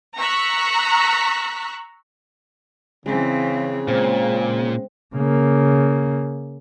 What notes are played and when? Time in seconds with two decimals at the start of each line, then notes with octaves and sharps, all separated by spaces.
0.18 A#5 C#6 E6 F#6 B6
3.06 C#3 E3 G#3 C4
3.88 A#2 G#3 C4
5.15 C#3 A#3